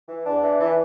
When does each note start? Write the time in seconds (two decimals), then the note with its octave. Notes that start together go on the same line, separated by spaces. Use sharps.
0.09 E3
0.25 E2 D4
0.43 E3
0.60 E3